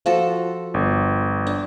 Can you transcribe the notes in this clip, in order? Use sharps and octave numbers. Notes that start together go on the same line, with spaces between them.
F3 F#4 A4
G1
D4